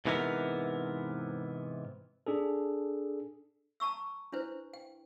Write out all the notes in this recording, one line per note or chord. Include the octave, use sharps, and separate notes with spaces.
G#2 C3 E3 B3 A#4
D4 G#4 A4
A5 A#5 C#6 E6
D4 E4 B4 C5
G5